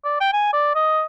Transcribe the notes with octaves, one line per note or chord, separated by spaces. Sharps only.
D5
G5
G#5
D5
D#5